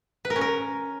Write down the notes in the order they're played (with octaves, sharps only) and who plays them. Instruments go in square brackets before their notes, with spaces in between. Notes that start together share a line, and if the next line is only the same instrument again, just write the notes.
[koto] B4
A#4
C#4
A#4